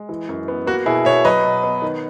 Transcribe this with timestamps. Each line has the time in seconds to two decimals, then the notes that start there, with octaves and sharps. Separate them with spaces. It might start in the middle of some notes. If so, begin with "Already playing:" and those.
Already playing: G#3
0.09 E3
0.29 F#2
0.48 B3
0.67 A#3 F#4
0.86 B2 E4 G#4
1.05 B2 C#5 E5
1.25 F#3 B4 D#5
1.43 B2
1.63 B3
1.82 D#3